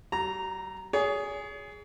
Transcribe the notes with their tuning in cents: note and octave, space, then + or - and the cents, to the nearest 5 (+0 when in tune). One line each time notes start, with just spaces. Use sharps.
G3 -45 A#5 -5
G#4 +0 C#5 +40